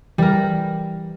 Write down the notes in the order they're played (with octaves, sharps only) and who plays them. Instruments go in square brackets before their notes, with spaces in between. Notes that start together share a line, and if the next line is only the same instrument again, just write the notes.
[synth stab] E3 [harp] G3 A#4